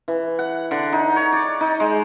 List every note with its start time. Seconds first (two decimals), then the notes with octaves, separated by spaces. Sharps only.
0.08 E3
0.39 F#5
0.71 D3
0.92 D#4
1.16 C#5
1.33 D5
1.61 D#4
1.80 G#3